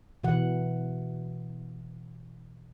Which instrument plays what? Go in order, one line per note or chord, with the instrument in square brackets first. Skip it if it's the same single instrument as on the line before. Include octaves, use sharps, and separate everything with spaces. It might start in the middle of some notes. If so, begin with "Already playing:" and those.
[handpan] B2 E3 F#5